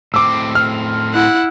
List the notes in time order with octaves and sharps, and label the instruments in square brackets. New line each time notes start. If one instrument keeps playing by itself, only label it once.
[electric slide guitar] A2 C4 [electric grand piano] D6 E6
[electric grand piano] F6
[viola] E4 F#5